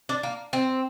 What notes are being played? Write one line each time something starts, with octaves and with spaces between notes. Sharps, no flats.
D4
A#3
C4